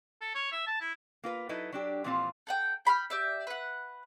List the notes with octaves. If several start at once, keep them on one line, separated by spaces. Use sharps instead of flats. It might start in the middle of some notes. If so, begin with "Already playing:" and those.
A4
C#5
E5
A5
E4
A#3 F4 B4
F#3 D#4 E4 A4 B4
F#3 D4 G4
A#2 E3 F3 C4 F4 F5
A4 F#5 G5
G5 B5 C6 F6
G4 D5 E5
B4 F#5